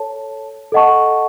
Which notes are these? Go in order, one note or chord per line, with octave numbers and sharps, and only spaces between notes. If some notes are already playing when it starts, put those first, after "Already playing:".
Already playing: A4 C#5 A5
A4 D#5 F#5 A5 C#6